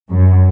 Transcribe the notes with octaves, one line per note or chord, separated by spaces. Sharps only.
F#2